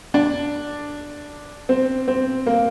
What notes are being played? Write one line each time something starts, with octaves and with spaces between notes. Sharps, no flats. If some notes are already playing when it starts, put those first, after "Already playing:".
D4
C4
C4
A#3